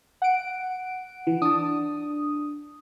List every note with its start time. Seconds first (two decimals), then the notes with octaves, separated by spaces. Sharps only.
0.22 F#5 D7
1.27 E3
1.42 D4 A5 D#6